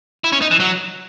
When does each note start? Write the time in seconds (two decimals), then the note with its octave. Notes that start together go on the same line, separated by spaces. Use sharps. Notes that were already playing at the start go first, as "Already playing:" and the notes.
0.24 E4
0.32 C#4
0.42 D#4
0.51 E3
0.60 F#3